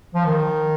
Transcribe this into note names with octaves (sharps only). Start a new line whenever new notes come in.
F3
D#3